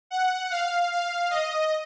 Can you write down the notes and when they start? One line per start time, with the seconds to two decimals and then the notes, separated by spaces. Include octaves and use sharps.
0.11 F#5
0.51 F5
0.91 F5
1.30 D#5